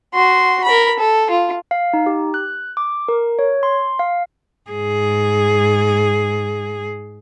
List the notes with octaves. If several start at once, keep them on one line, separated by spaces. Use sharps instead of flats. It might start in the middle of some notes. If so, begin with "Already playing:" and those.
F#4 C6
A#4 B5
A4
F4
F5
D#4
G4
F#6
D6
A#4
C#5
C6
F5
G#2 G#4